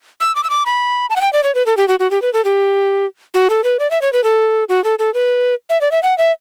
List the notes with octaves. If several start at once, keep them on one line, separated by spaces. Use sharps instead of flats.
E6
D6
E6
D6
B5
A5
F#5
G5
D5
C#5
B4
A4
G4
F#4
F#4
G4
B4
A4
G4
F#4
A4
B4
D5
E5
C#5
B4
A4
F#4
A4
A4
B4
E5
D5
E5
F#5
E5